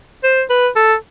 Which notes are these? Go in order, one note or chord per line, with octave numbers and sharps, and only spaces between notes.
C5
B4
A4